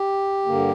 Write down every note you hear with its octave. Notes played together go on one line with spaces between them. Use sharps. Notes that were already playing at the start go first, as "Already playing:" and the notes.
Already playing: G4
G2 D3 A#3